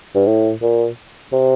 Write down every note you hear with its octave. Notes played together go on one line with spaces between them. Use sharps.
G2
A2
A#2
C3